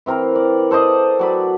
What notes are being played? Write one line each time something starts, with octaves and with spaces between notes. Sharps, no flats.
E3 C4 A#4
D5
A4 C5 D5 D#5
F#3 D5 B5